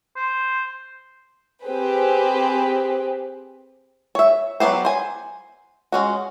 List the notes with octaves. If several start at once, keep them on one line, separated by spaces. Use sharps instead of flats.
C5
C4 G4 G#4 B4 C5
C#5 E5
F#3 A3 B3 G4 C5
C5 G#5
G#3 C#4 F#4